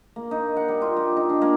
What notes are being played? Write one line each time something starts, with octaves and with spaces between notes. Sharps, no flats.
A#3
D#4
F#5
G3
F4
G4
D#4
D4
A#3